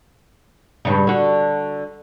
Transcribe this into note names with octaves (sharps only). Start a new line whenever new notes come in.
G2 C#3
D3 F#4